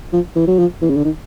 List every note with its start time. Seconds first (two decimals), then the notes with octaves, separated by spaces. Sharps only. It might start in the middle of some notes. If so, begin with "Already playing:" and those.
0.13 F3
0.35 E3
0.47 F#3
0.59 F3
0.81 E3
0.90 C#3
0.97 D3
1.04 D#3